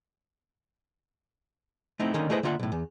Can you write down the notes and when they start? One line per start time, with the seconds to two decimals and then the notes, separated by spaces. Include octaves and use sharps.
2.00 A3 C4 D#4 E4
2.14 D3 D#3 A#3 C#4 D#4 D#5
2.30 A3 E4 G#4 B4 C5 D#5
2.43 D3 A#3 F4 E5 F#5
2.59 B1 A2
2.72 E2